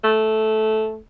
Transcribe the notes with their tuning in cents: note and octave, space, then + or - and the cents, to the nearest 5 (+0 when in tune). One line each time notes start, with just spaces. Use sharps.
A3 -10